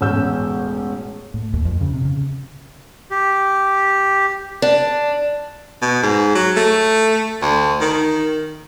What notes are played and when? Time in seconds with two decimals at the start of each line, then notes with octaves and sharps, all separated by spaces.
0.01 E1 A1 C#4 E6 G6
1.34 A2
1.53 D#2
1.65 F2
1.81 C#3
1.93 C3
2.05 C#3
3.11 G4
4.62 D4
5.82 B2
6.03 G#2
6.35 F#3
6.56 A3
7.42 D2
7.80 D#3